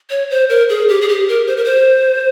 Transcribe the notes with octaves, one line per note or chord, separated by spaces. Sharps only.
C#5
C5
A#4
G#4
G4
G#4
G4
A#4
C5
A#4
C5